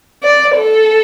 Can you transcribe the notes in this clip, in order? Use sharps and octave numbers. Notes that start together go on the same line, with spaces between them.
D5
A4